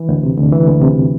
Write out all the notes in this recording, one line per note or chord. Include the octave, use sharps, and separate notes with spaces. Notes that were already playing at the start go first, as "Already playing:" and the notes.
Already playing: E3
D2
C3
D2
E3
D2
C3